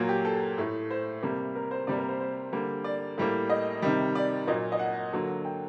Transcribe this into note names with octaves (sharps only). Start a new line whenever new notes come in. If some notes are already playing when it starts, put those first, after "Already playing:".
Already playing: A#2 F#3 A#3
G4
A4
A2 A3
C5
C3 G3 A#3
A#4
C5
C3 G3 A#3 D5
A#4
C5
C5
D3 G3 A#3
D5
A2 G3 A#3
D#5
C3 D#3 G3
D5
A#2 F#3 A#3 D#5
D#5
F#5
D3 F#3 A#3
G5